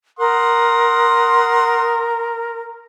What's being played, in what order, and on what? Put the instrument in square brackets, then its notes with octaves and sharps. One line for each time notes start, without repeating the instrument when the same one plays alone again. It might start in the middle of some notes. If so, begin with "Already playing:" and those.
[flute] A#4 [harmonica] F#5 C6 D#6